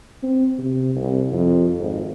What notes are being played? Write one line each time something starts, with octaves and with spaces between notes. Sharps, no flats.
C4
C3
C2
F2
G#1